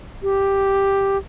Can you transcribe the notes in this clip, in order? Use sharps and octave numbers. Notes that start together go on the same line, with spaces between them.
G4